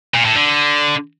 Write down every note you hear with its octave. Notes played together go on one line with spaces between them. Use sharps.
A#2
A2
D3